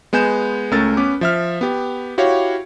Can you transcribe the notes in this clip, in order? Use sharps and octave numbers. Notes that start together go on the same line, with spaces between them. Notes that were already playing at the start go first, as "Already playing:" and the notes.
G#3 B3 G#5 G6 E7
C#2 A3 C#4 A#4 E6 A6
B3 C#4 B4 D6
F3 E5 F6
B3 G4
E4 F#4 G4 C#5 F5